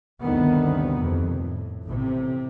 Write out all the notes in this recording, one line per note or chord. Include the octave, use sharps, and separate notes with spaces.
G1 D2 C3 D#3 B3
F2 C3
A2
A1 C3